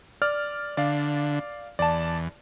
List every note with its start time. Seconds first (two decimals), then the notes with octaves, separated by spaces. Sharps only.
0.22 D5 F6
0.77 D3 D5 F5
1.79 E2 D5 A5